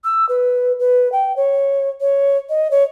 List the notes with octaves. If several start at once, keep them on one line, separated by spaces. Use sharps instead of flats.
E6
B4
B4
G5
C#5
C#5
D#5
C#5